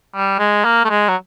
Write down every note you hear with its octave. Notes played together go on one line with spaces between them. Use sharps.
G3
G#3
A#3
A3
G#3
F#3